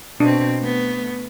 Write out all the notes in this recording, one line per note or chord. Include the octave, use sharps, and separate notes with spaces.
B2 C4 D4
A3 B3